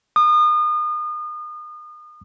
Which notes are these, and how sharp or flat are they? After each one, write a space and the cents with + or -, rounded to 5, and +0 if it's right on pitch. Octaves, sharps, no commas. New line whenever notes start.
D#6 -35